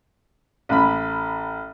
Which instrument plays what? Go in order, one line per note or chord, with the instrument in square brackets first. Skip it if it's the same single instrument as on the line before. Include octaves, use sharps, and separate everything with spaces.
[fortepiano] A1 B5